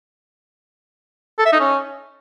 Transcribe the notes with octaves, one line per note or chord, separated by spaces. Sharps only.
A4
E5
D#4
C#4